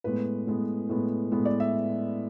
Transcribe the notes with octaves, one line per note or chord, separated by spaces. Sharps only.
A2 G#3 B3 B4
A2 G#3 B3
A2 G#3 B3
A2 G#3 B3
D5
E5